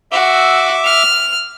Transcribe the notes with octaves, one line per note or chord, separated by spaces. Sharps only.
F#4 E5 D6 E6
F6